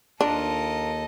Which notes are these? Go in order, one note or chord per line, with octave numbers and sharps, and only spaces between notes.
D#2 D4 F4 A4 A#4 D#5